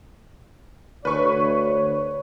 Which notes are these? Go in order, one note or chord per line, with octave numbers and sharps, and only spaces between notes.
D2 B4 C#5 C#6